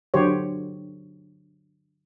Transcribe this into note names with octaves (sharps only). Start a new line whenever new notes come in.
D3 F#3 G4 C5 C#5